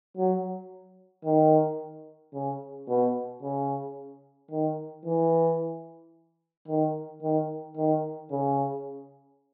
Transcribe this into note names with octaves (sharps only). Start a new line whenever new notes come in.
F#3
D#3
C#3
B2
C#3
D#3
E3
D#3
D#3
D#3
C#3